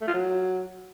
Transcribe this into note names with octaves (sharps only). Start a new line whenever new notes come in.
A3
F4
F#3